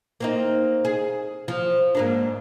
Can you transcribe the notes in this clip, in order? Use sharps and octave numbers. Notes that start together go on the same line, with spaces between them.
A#3 C4 D#4
G#4
F3
G#2 A#3 D4